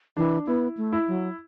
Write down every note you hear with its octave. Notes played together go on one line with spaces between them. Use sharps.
E3 D4
B3 E4
A3
E4
F#3